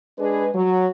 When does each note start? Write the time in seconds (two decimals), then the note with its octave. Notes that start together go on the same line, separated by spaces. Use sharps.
0.18 G#3 D4 G#4 B4
0.54 F#3